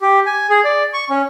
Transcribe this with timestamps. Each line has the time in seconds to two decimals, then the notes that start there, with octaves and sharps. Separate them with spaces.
0.01 G4
0.26 G#5
0.50 G#4
0.64 D5
0.94 C#6
1.10 C#4